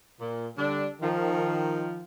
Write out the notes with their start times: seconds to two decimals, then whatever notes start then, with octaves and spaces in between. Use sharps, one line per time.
0.20 A#2
0.57 D3 G3 D4
1.02 D#3 F3